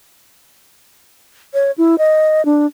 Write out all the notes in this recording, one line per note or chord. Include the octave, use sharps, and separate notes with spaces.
C#5
E4
D#5
D4